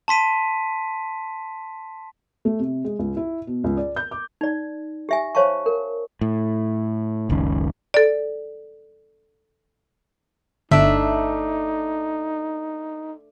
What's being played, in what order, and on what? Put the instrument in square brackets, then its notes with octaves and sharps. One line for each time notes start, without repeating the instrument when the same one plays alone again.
[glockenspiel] A5 C6 B6 D#7
[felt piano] A3
C3
G#3
C#2
E4
B2
C#2
D5
G6
D6
[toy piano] D#4 D5
G4 E5 G#5
C5 C#5 F5 A5 C#6
A#4
[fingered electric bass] A2
F#1 C#2 D#3 C#4
[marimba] A4 D5
[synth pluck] G1 [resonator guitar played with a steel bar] A3 D4 [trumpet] D#4 [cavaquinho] E5